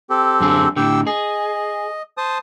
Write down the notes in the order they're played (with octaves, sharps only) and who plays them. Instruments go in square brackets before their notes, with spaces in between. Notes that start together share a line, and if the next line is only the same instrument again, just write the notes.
[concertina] C4 G4 A4
[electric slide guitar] F#2 D3 G#4
[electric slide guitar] A2 D3 [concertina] G4 G5 E6
[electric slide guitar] G#4 [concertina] D#5
[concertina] C5 A5 D#6